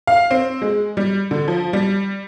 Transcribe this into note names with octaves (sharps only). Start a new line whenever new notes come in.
F5
C4
G#3
G3
D3
F3
G3